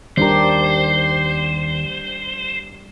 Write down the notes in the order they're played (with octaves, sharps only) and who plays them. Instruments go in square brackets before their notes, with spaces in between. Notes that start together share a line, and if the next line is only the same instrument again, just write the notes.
[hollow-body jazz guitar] D#2 A#4 [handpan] G3 D4 G4 [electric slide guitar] C5